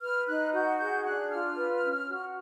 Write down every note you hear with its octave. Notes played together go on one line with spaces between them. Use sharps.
B4 F6
D#4 F#6
F#4 G6
G#4 G6
D4 F#6
F4 F6
B4
C#4
F#4